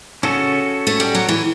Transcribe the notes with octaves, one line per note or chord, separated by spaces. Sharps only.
C#3 C#4 F#4 A4
A3
G3
F#3
E3